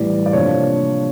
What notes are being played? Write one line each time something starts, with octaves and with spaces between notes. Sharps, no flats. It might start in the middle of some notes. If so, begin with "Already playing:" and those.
Already playing: A2 E3 G3 D5
D5
C3 F3 A#3 D4 C#5